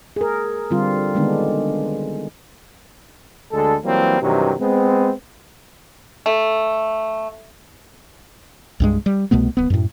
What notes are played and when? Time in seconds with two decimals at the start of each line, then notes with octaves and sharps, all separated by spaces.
0.16 G#4 A#4
0.70 D3 G3 C4 F4
1.15 D3 D#3 G#3 B3 D4
3.52 D2 D3 G#3 A4
3.84 E3 F#3 G3 A#3 C4
4.21 G2 C3 D#3 E3 F#3
4.60 G#3 B3 C4
6.26 A3
8.80 C2 G2 G#3
9.06 G3
9.31 C2 B2 A3 B3
9.57 D1 B3
9.70 F#2 A2